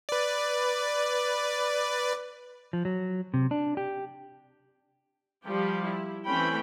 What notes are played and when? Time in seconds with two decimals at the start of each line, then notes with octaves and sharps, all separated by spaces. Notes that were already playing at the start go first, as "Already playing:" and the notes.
0.09 B4 D5
2.73 F3
2.85 F#3
3.34 C3
3.51 D4
3.77 G4
5.45 F3 G3 G4
5.86 E4
6.26 E3 A3 C4 C#4 G5 B5